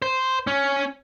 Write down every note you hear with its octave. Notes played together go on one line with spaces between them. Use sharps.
C5
C#4